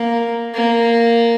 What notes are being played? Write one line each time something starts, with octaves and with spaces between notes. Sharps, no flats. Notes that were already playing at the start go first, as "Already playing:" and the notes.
Already playing: A#3
A#3